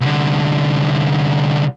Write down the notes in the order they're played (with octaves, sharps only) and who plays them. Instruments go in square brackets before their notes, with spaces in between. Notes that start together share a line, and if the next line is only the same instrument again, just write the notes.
[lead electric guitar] C2 D3